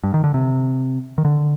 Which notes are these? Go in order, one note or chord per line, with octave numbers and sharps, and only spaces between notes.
G2
D#3
D3
C3
D#3
D3